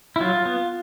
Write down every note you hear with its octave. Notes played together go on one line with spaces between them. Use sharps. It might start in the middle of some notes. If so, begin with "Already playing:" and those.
E4
F#3 F4
B3